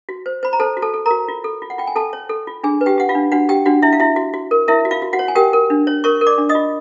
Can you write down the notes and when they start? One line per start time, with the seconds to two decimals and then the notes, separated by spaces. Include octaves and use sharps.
0.09 F#4
0.26 C5
0.43 C5 B5
0.53 A#5
0.60 A4 C5 A5
0.77 F#4
0.82 A4 A5
0.94 A4
1.06 F#4 A#4 A#5
1.28 F4
1.44 A4
1.62 F4
1.70 F#5
1.78 F4 G5
1.87 G#5
1.96 A4 A5
2.13 C#5
2.29 A4
2.47 F4
2.63 D4 G#4 G#5
2.81 B4
2.86 G4 G5
2.98 G4 F#5
3.09 F4 F5
3.15 D4
3.32 D4 F#4 F#5
3.49 G4 G5
3.66 D4 F#4 F#5
3.82 D4 E4 E5
3.93 F5
4.00 E4 F#4 E5
4.16 F#4
4.34 F#4
4.51 A#4
4.68 E4 A#4 E5
4.85 F#4
4.91 F4 F5
5.02 F#4
5.13 F#4 F#5
5.19 C#5
5.28 G#5
5.35 G4 A#4 G5
5.53 A#4
5.70 D4
5.87 C#5
6.04 A#4 C#5 C#6
6.21 A#4
6.27 D5 D6
6.38 D4
6.49 D#5 D#6
6.55 F4